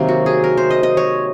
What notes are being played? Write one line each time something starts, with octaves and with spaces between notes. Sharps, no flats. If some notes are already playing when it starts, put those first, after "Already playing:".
Already playing: C3 D#3 F#3 A#3
F#4
G#4
A#4
C5
D#5
D#5
C#5